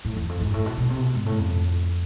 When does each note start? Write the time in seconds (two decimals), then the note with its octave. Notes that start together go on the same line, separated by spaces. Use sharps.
0.05 A2
0.17 E2
0.29 F2
0.41 G#2
0.54 A2
0.66 B2
0.78 B2
0.90 C3
1.02 B2
1.15 G#2
1.26 A2
1.39 F2